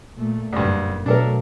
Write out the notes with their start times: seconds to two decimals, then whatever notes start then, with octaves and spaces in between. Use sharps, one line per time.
0.15 A#2 A3
0.53 F#1 D2 G2
1.06 B2 F#3 A3 D4 A4 A#4